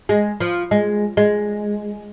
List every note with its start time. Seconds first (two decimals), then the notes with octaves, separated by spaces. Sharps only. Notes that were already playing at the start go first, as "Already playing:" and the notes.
0.09 G#3
0.40 F3
0.71 G#3
1.17 G#3